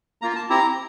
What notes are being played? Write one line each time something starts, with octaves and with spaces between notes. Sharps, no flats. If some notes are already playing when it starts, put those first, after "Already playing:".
A#3 F4 A#5
A5
C4 E4 G4 A#5